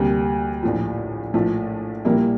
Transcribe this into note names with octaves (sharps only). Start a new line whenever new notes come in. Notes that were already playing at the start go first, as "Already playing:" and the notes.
Already playing: D2 C3 G3 A#3
A#1 A2 F3
A#1 A2 F3 A3
A#1 A#2 G3 A#3 E4